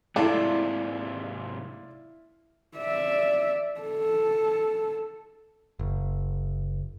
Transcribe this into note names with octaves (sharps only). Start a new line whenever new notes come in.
G#2 C3 A3 D4 E4 F4 D5 E5
D5 E5
A4
F#1